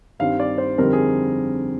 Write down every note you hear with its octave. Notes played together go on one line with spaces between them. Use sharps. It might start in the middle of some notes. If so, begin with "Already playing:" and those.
G2 D#3 G3 C4 F5
D5
C5
F2 D3 G3 C4 D#4 A#4
G#4